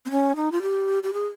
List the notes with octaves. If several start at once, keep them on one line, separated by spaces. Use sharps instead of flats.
C4
C#4
D#4
F4
G4
G4
G#4